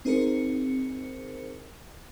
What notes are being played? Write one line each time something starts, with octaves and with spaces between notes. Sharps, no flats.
C4 D#4 G#4 A#4 C5 C#7